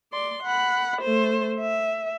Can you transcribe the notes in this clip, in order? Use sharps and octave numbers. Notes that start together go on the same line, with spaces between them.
D5 C6
F#5 B5
A3 C5
E5